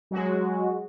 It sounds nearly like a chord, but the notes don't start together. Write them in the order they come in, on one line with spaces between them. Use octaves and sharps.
F#3 F#4 G#3